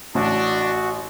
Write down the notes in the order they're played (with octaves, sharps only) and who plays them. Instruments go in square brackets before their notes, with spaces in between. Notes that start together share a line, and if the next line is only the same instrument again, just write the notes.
[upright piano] A1 [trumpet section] D4 [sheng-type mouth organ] F#4